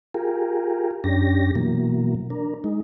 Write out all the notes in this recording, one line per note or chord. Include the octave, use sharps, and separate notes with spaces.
F4 G4 G#4 A#4
F#2 C#4 D4 G4 A#6
B2 E3 F#3 A#3
D4 A#4
G#3 D#4